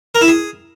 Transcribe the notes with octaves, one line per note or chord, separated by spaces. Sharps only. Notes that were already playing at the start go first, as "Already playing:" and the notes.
A#4
E4
G#4